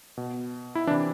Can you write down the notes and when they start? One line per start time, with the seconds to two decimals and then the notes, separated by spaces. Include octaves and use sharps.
0.17 B2
0.75 E4
0.87 E3 D4
0.91 C3